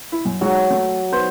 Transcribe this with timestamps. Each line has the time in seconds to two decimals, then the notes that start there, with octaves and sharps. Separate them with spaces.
0.12 E4
0.25 F#2
0.41 F#3 G#3 F#4
0.71 A3
1.12 B3 C5